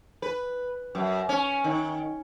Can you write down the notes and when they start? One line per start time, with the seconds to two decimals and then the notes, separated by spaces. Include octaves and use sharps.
0.22 B4
0.95 F#2
1.29 C#4
1.64 D#3